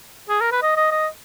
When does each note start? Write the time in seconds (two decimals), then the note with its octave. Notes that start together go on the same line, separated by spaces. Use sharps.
0.29 G#4
0.41 A#4
0.52 B4
0.62 D#5
0.77 D#5
0.92 D#5